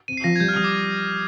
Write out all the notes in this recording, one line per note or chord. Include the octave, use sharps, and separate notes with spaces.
C4 D#7
C7
F3 A#6
G#6
G3 G6
F6
G3 D#6
D6